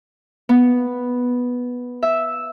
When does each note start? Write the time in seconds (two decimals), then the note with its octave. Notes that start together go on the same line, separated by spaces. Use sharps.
0.49 B3
2.03 E5